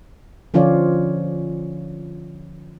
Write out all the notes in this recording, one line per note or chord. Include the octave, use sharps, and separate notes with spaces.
D3 F3 C#4 F4 C#5 D5